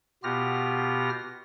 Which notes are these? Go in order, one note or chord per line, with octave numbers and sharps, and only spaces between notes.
B2 B3 F4 G4 F6 A#6